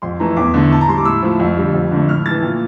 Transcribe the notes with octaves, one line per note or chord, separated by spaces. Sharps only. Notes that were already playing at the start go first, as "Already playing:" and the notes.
F2 C6
E3 A3 A#5
E2 D6
D3 A3
A2 A5
A#5
G3 C6
D6
A2 E6
F3 A3
F2
D3 G3
F2
D3 A3
A2 F6
E3 A3 A6
A#2